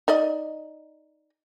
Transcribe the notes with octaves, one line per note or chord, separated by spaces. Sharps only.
D#4 D5 D#5